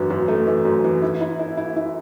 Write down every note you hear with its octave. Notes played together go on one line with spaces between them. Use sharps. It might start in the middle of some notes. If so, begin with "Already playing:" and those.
Already playing: F#2 E3 D4
F#2
A3
E3
F#2
E3
E4
E4
E4
E4
E4